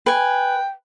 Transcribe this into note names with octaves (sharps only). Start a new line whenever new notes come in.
B4 G5 G#5